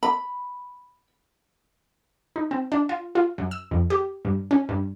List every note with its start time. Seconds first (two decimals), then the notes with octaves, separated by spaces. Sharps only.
0.03 B5
2.36 D#4
2.51 C4
2.72 D4
2.89 F4
3.15 F4
3.38 F#2
3.51 E6
3.71 F2
3.90 G4
4.25 G2
4.51 C#4
4.69 G2